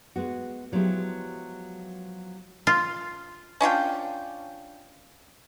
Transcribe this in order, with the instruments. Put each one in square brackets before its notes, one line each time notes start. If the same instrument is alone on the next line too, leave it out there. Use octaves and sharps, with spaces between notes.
[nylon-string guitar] G#3 B3 F#4
F3 F#3 G#3 B3 E4 G4
[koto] F4
[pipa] C#4 D4 F4 G5